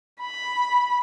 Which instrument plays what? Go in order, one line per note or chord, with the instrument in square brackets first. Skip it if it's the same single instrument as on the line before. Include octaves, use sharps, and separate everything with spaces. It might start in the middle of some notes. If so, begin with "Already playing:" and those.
[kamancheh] B5